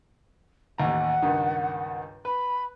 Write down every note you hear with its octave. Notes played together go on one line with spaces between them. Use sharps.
A1 D#2 F#5 A#5
C#2 G2 D#3
B4 B5